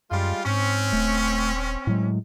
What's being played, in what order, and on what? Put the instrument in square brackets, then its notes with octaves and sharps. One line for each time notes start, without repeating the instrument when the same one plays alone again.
[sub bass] F#2 [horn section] G3 G#3 F4
[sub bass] G#2 [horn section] C4 C#4
[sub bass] D#1 [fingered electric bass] A3
[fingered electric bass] A2 F#3 G#3